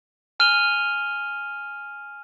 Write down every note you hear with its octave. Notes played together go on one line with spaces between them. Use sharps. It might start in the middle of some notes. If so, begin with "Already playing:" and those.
G#5 F6 D#7 F7 G7